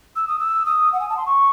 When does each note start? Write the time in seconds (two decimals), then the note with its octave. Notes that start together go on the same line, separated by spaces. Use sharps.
0.16 E6
0.28 D#6
0.39 E6
0.65 D#6
0.93 F#5
1.00 G#5
1.09 A5
1.17 C6
1.26 C#6